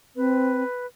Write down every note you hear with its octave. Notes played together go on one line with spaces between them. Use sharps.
C4 B4